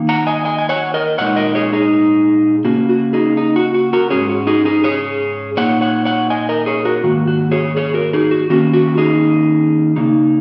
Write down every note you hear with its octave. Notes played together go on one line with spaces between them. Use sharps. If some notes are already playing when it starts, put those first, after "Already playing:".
Already playing: D#3 A#3 D#4
F#5 A#5
D#5 G#5
D#5 G#5
G#5
C#5 F#5
A#4 D#5
A#2 G#3 D#4 C#5 F#5
A#4 D#5
G#4 C#5
D#4 G#4
C#3 A#3 C#4 F#4
F#4
D#4 G#4
D#4
F#4
F#4
F#4 A#4
G#2 G#3 C#4 G#4 C#5
F#4
D#4 G#4
D#4 G#4
G#4 C#5
A#2 A#3 D#4 C#5 F#5
C#5 F#5
C#5 F#5
D#5 G#5
A#4 D#5
G#4 C#5
F#4 A#4
G#2 D#3 A#3 F#4
F#4
G#4 C#5
G#4 C#5
F#4 A#4
D#4 G#4
F#4
D#3 A#3 C#4 F#4
F#4
D#4 G#4
C#3 A#3 D#4